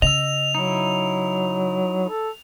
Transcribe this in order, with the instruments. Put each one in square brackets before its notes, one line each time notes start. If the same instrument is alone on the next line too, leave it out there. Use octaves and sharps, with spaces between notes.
[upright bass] C#3 [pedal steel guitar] D#5 E6 [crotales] F7
[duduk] F#3 [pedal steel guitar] D#4 E4
[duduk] A4